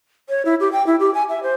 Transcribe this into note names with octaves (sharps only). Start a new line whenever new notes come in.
C#5
E4
G4
G5
E4
G4
G#5
E5
C5